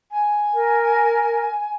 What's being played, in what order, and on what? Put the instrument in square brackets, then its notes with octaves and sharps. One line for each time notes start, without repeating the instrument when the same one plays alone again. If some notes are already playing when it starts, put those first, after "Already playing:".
[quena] G#5
[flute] A#4